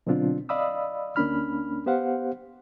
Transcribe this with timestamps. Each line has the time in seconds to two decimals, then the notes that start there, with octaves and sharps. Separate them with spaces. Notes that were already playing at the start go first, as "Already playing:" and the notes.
0.07 B2 D3 F#3 C4 D4 F4
0.49 D5 D#5 F5 B5 D#6 E6
1.16 D2 A#3 C#4 D4 B5 F6
1.86 B3 G4 C5 F5 F#5